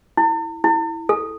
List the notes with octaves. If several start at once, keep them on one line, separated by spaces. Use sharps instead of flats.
E4
E4
A4